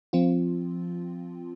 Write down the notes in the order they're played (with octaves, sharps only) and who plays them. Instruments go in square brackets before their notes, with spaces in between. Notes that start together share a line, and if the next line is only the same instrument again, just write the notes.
[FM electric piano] F3 C4 F4